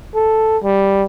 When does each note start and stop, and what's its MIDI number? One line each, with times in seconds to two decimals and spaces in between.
0.15 0.58 69
0.64 1.04 55